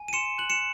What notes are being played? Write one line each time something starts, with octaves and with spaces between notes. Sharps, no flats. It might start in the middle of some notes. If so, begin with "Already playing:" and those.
Already playing: G#5
D#7
C6 C#7 E7
F#6 F#7
C#7 E7